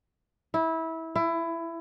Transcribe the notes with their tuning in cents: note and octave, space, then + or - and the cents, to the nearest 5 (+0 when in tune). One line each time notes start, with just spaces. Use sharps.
E4 -20
E4 +20